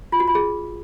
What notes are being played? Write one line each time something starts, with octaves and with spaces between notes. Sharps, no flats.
F4
F#4
F4
G#4